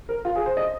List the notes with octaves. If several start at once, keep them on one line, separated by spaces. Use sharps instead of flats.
A#4
F4
G#4
C5
D#5